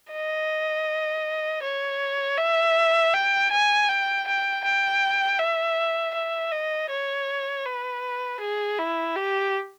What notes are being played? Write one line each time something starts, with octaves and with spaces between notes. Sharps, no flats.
D#5
C#5
E5
G5
G#5
G5
G5
G5
E5
E5
D#5
C#5
B4
G#4
E4
G4